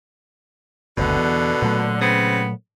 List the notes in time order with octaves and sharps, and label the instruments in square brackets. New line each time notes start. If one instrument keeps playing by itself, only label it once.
[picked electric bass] F#1 D2 [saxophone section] B2 D3
[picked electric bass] E2
A#2 F#3 A3
[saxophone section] C#3 B3 C4